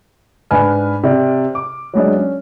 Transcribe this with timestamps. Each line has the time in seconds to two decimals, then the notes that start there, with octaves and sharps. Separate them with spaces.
0.51 G#2 D4 B4 G#5 F6
1.03 C3 D5
1.55 D6
1.94 F#3 G#3 D4
2.16 C#4